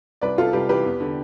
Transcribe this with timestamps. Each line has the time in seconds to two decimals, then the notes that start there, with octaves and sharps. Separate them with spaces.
0.21 C2 B4 D5
0.38 C3 F4 A4
0.53 C2 G4 B4
0.69 E3 G4 B4
0.85 E2
1.00 D3